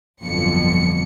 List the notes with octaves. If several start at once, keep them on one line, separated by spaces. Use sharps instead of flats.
G1 F2 B2 D3 F#3 C#7